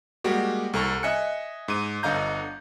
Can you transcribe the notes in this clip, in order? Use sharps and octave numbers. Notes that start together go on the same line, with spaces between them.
G3 G#3 A#3 F#4 G4
C2 A4 A#5 C#6
D#5 E5 G#5 F#6 C#7
G#2 D#7
G1 D3 D#5 F5 A#5 G6